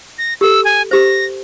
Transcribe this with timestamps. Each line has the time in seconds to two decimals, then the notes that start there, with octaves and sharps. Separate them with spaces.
0.18 A#6
0.41 G4 A4 E6
0.65 G#5
0.91 G4 C5 A#6